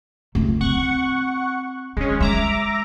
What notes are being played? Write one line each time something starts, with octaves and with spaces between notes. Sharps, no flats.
C#2 A3
C4 F#5 C#6
D#3 G#3 C#4
G#3 E5 A#5 D6